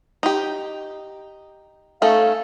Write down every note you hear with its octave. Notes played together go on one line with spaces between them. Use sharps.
D#4 G4
A3 C#4 D#4 A4 F5